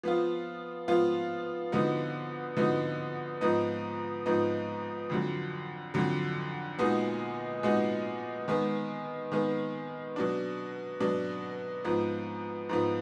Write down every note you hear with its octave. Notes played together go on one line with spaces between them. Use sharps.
F3 B3 F4
F3 B3 F4
D3 F3 B3 D#4 F#4
D3 F3 B3 D#4 F#4
G#2 F3 B3 D#4
G#2 F3 B3 D#4
F2 D3 F#3
F2 D3 F#3
A#2 G#3 B3 D#4 F#4
A#2 G#3 B3 D#4 F#4
D#3 G#3 B3
D#3 G#3 B3
B2 F#3 D4
B2 F#3 D4
G#2 F3 B3
G#2 F3 B3